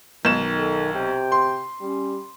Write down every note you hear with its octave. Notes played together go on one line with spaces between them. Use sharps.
B1 D#3 G#3 E7
A4
C3 G5
C6
G3 C#4